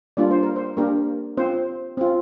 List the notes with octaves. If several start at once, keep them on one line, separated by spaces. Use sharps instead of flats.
G3 A#3 D4 F4 D5
C5
A#4
C5
A#3 D4 G4 A#4
C4 F4 C5
C4 F4